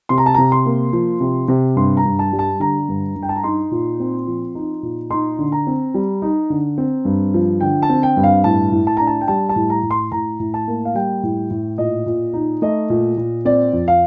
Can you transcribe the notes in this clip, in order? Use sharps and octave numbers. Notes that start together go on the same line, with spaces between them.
C3 C6
A#5
A5
C3 A#5
C6
A#3
F3
C3
C3
G2 C6
A#5
G2
A5
G3
A5
D3 A#5
G2
G2
G5
A5
A#5
D#4 C6
A#2
C4
F3
D#4
A#2
D#4 C6
D3
A#5
C4
G3
D#4
D3
C4
G2
F3
D3 G5
A5
C4
G5
G2
F5
A2 A5
A2
A5
D4 A#5
A5
G5
G3 A5
A5
A2
A#5
A2
C6
A2 A#5
A2
A5
A#3
F5
G3 G5
A2
A2
A#2 D#5
A#2
D#4
A3 D#5
A#2
A#2
C4 D5
F2
F5